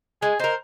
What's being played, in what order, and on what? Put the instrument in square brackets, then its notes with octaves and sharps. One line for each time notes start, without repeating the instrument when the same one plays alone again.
[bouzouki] G#3 [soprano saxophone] G#4
[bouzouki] D#4 A#4 [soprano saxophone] C5